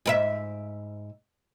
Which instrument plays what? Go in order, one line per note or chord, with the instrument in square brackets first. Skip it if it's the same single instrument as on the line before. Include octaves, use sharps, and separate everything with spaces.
[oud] G#2 A#4 E5